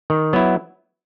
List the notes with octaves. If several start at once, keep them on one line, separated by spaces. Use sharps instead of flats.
D#3
F#3 B3 E4